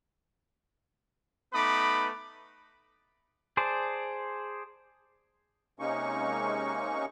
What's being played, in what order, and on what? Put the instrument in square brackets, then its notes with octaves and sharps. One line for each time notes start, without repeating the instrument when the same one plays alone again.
[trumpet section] A3 B3 D#4 B4 B5 D6
[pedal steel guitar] G#4 C5 D5 A5
[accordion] C3 G#3 A#3 C#4 D#4 C#6